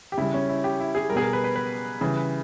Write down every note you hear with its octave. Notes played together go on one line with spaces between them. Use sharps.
G4
C#3 G3 E4
C#4
E4
G4
E4
G#4
G3 A#4
B2 G#4
A#4
B4
B4
B4
C#3 E3 G3